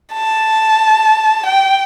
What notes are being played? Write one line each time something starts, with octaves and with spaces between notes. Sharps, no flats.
A5
G5